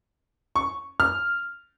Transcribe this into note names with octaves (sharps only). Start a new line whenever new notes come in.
C#6
F6